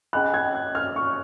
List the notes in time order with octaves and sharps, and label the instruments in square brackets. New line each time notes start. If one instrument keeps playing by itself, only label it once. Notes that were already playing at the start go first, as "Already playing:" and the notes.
[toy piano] C#4 G#4 D#5 G#5 B5 [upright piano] F#6
[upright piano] G#6
F#6
F6
C#6